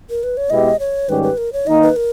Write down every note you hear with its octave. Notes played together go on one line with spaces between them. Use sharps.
A#4
B4
C#5
B2 G#3 B3 E4 G4 D#5
C#5
G#2 D#3 G3 C#4 G4 B4
B4
A#4
C#5
D#3 A#3 D#4 D#5
B4
A#4